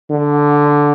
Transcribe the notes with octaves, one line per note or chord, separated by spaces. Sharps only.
D3